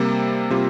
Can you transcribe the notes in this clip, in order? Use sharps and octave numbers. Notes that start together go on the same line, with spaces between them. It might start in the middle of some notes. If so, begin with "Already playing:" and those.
Already playing: C3 G3 A#3
C3 G3 A#3 F4